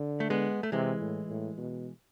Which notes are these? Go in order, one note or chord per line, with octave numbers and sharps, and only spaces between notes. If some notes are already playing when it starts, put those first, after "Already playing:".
Already playing: D3
A3
G#3 B3
A3
C3 E3 G#3
A2
A2
B2